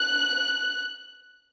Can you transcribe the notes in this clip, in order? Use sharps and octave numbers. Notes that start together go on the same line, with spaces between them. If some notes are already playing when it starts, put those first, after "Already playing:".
Already playing: F#6